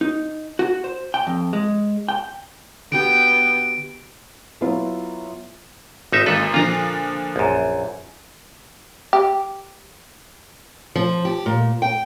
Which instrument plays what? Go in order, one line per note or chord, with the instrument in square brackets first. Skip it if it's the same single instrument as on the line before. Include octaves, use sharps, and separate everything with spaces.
[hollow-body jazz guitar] D#4
F#4
C5
G5
F2
G#3
G5
[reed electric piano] D3 F#4 G4 [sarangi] B3 [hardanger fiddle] G5 [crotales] D7
[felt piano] F#3 B3 E4 F4
[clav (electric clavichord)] G#1 D#4 E5
[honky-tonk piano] G#1 A#3 [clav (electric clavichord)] A4 B4
[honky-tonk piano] A#2 D3 F3 [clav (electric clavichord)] F4 A#5
[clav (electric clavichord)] A#1 F#2
[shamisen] G4
[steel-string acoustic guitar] F3
G4
A#2
G5